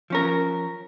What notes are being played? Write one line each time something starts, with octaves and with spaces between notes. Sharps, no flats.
F3 C#4 A#4